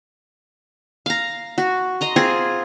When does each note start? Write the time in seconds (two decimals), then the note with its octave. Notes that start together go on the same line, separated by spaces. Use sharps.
1.06 F5 A#5
1.58 F#4
2.01 D#5 A#5 C6
2.16 C4 F4 G#4